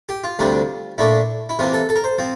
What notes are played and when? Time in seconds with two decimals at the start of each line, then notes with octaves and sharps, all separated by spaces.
0.09 G4
0.24 F4
0.39 D2 C3 G3 D4
0.98 A#2 A3 D4 E4
1.49 E4
1.59 C3 E3 A#3 F4
1.73 A4
1.89 A4
1.96 A#4
2.04 C5
2.18 F3 C4